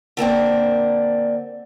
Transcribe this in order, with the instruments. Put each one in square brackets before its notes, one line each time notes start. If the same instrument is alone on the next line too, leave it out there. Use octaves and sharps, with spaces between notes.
[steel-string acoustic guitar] D3 A#3 C4 D4